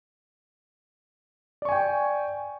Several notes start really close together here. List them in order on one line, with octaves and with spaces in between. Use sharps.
D5 C#6 G#5 G5